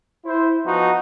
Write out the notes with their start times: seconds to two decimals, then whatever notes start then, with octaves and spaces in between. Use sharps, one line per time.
0.25 E4 C5
0.65 F3 B3 D#4 F#4